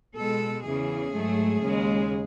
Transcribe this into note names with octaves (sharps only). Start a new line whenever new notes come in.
B2 G#3 A4
E2 C#3 E3 G#4
G#2 F#3 A3
D#2 C#3 G#3